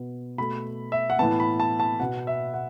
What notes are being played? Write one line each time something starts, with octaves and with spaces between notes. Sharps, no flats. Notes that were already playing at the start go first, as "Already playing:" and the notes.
Already playing: B2 B3
B2 A3 B5
E5
F#5
A2 E3 B3 A5
B5
A5
A5
B2 B3 F#5
E5
F#5